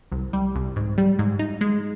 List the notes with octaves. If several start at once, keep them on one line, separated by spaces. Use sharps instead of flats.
C2
G3
C2
G#2
G3
G#2
D#4
G#3